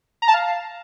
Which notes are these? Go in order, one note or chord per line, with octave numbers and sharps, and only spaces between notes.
A#5
A5
F5